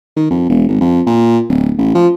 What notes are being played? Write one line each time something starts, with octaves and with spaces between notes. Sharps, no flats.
D#3
F2
E1
G#1
F2
A#2
D1
A1
F3